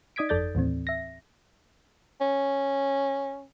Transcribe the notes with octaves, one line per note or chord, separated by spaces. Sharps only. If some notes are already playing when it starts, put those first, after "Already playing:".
D#4 D5 D#6 G#6 B6 D7
G1 F2 A4 D5 G6 A6
D#2 A2 E3 C4
E5 A#6
C#4